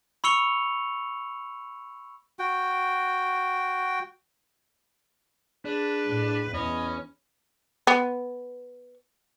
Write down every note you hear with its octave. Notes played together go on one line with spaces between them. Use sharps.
B5 C#6 E6 C#7 F7 G7
F#4 G5
D4 G#4 B4
A2
E2 C#4 D#5 B5
B3